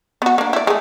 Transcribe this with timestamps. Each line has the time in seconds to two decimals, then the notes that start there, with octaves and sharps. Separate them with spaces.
0.22 B3 F#4
0.38 A#3 D4
0.53 E4 D5
0.67 G#3 A3